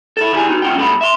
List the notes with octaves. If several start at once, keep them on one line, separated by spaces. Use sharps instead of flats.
E4 A4
D#3 E4 G4 G#4 G#5
D#4 F#4
C#4 E4 F4 F#5 G5
G2 B2 A3 G#4 F#5 B5
E5 C6